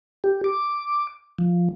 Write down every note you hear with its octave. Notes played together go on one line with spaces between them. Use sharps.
G4
D6
F3